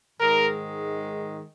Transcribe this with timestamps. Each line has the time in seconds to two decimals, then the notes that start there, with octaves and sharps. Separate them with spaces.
0.20 G#2 D#3 G#3 A#4